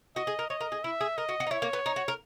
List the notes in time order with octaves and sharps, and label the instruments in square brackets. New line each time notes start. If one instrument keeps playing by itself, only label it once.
[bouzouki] F#4 [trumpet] D#5
[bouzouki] G#4
A#4
[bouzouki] C#5 [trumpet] D#5
[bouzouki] A#4
G#4
[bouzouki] E4 [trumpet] E5
[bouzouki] G#4
[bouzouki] A#4 [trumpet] D#5
[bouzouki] F#4
F#4
D#4
[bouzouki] E4 [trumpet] C#5
[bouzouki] A#3
B3
D#4
F#4
A#4